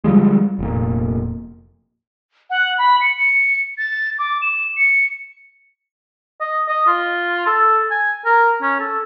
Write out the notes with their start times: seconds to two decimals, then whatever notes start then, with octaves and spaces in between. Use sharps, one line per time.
0.04 D3 F3 G3 G#3
0.59 F1 A#2
2.50 F#5
2.78 B5
3.01 C#7
3.17 C#7
3.78 A6
4.19 D6
4.42 E7
4.77 C#7
6.40 D#5
6.68 D#5
6.87 F4
7.47 A4
7.91 G#5
8.25 A#4
8.62 C#4
8.80 A4